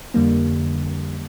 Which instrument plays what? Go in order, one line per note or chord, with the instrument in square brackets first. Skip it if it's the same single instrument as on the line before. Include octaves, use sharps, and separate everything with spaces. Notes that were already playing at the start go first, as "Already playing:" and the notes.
[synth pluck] F2 D3 G3 A#3